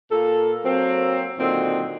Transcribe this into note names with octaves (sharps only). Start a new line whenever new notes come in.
A#2 A#3 A4
F#3 A#3 C4
A#2 D3 D#3 F#3 C4